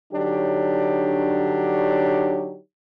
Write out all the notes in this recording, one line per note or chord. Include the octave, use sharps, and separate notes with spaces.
D3 F#3 D4 D#4 G4 C#5